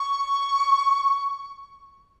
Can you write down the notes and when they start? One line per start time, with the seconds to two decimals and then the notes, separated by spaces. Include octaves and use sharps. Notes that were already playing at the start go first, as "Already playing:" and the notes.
Already playing: C#6